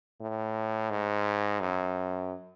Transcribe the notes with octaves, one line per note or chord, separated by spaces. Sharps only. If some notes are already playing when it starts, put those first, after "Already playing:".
A2
G#2
F#2